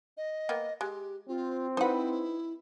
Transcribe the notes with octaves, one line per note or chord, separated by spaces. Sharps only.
D#5
A#3 B3 G5
G#3 G4
C4 F4
D#4 E4 B4 C5 F#5